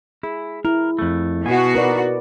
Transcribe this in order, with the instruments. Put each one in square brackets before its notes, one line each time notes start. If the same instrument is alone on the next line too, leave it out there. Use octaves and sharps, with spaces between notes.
[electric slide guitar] E4 [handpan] G#4
[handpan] E4 [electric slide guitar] A#4
[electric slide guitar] F2 A3
[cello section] B2 F#4 [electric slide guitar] G#5
[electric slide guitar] D#4 [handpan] A#4 B4 D5